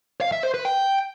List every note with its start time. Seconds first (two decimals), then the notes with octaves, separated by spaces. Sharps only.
0.21 F5
0.32 E5
0.43 C5
0.54 B4
0.65 G5